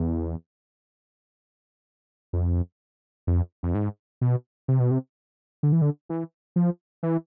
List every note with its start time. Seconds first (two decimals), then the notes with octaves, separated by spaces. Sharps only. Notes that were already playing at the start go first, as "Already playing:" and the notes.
Already playing: E2
2.33 F2
3.27 F2
3.63 F2
3.74 G#2
4.21 B2
4.68 C3
4.80 B2
4.91 C3
5.63 D3
5.72 E3
5.82 D3
6.09 E3
6.56 F3
7.03 E3